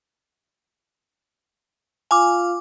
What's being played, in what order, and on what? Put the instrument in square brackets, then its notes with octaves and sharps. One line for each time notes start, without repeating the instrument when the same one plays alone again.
[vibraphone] F4 F5 [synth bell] G#5 D6